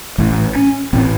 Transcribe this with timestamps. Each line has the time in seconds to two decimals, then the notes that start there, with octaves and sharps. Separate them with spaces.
0.18 A1 A2 A3
0.56 C#4
0.93 A1 A2 C4